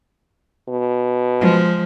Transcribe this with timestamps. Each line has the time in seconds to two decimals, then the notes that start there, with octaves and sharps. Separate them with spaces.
0.69 B2
1.41 F3 G#3